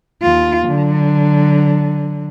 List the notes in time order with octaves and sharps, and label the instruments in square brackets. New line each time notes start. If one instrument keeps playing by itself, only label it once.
[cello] D#2 F4
D3 F#3